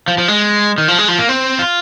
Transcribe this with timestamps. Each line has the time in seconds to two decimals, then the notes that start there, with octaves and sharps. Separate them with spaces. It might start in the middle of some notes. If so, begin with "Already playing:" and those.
0.08 F3
0.18 F3
0.28 G#3
0.78 D#3
0.88 F3
0.98 G#3
1.08 F3
1.19 A#3
1.29 C4
1.59 F4